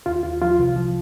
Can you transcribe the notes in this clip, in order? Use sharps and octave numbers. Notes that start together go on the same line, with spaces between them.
D#2 F4
D#2 F4
F3 F4
C2
F3